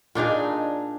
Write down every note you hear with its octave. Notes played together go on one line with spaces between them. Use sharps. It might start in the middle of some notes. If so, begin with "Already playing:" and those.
A#2 D4 D#4 G#4